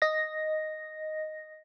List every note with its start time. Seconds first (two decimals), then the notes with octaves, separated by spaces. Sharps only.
0.02 D#5 A#6